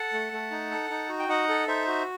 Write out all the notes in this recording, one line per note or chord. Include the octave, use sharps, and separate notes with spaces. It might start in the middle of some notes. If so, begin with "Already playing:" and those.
Already playing: A4 F#5 A5
A3
A3
D#4
A4
D#4
F#4
G5
D#4 D#5 F#5
A4
D#4 C5 E5
F#4